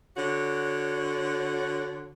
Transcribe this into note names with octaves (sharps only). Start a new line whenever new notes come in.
D3 F#4 C#5